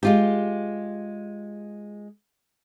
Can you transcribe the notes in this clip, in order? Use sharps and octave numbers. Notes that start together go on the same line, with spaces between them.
G#3 F4 G4